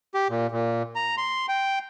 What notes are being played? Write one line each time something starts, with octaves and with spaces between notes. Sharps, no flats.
G4
A#2
A#2
A#5
C6
G5